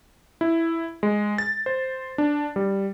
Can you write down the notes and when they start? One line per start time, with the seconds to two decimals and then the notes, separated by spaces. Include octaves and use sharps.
0.41 E4
1.03 G#3
1.38 A6
1.66 C5
2.18 D4
2.56 G3